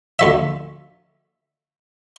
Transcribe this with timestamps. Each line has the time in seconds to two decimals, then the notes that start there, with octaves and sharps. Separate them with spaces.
0.19 D2 F3 E5